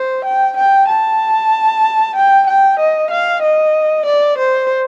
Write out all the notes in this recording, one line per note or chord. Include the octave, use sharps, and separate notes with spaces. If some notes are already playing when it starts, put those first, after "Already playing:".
Already playing: C5
G5
G5
A5
G5
G5
D#5
F5
D#5
D5
C5